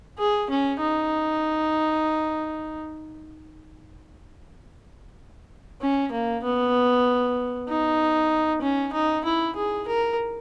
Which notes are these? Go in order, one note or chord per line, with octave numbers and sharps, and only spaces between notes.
G#4
C#4
D#4
C#4
A#3
B3
D#4
C#4
D#4
E4
G#4
A#4